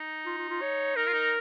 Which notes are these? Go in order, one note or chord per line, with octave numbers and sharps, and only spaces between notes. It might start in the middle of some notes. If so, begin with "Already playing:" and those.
Already playing: D#4
F4
F4
F4
C#5
D#4 A#4
F4
D#4